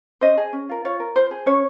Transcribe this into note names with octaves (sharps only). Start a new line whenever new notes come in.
C#4 C5 D#5
G#4
C#4
F4 A#4
F4 C#5
A#4
F4 C5
G#4
C#4 C#5